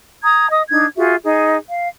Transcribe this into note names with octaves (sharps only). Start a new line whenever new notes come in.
A#5 D#6 G#6
D#5 D#6
D4 D#4 G#6
F4 F#4 G#4 E5
D#4 G#4
F5